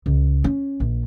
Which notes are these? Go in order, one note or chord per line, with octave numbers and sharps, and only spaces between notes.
C#2
C#4
A#1